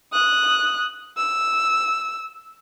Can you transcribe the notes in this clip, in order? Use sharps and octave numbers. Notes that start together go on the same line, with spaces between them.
D#6 F#6
E6